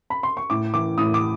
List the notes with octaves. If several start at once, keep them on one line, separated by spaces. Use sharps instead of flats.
B5
C6
C#6
A2 D6
E3 D6
A2 D#6
D6